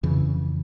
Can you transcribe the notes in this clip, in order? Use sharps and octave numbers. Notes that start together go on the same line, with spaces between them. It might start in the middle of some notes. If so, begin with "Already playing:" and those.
F2 C#3 E3